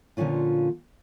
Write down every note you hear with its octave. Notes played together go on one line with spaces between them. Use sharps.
A#2 D3 F3 F#3 C#4 F4